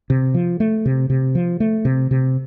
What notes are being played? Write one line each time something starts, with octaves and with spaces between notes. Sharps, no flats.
C3
F3
A3
C3
C3
F3
A3
C3
C3